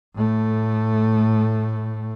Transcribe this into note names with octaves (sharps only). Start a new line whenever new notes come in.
A2 A3